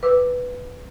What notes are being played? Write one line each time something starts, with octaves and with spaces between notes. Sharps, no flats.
B4 D6 E6